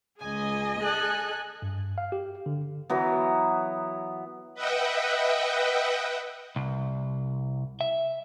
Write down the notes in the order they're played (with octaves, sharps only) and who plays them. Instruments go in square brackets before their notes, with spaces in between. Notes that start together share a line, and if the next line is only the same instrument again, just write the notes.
[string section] C#2 G#5 [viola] G#4 D#5
[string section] A4 G#5 F#6
[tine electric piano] G2
F5
G4
D3
[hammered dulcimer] E3 F#3 B3
[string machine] B4 D#5 E5 F#5 G5
[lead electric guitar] C2
E5